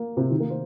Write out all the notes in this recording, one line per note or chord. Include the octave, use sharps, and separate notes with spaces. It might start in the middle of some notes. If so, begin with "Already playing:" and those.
Already playing: A#3
C3 C4
D#3 D#4
A#3 A#4
C5